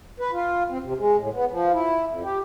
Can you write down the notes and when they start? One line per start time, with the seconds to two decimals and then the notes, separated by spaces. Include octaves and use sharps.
0.20 B4
0.32 F4
0.69 C4
0.84 C3
0.98 G#3
1.17 A2
1.33 B3
1.52 F3
1.72 E4
2.08 F2
2.23 G4